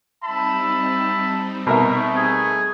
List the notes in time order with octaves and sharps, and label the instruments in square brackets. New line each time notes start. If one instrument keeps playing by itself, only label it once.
[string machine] G3 C4 D#4 [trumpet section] E5 A5 B5
[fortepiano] B2 A#4 E5 [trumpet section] A3
[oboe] G#4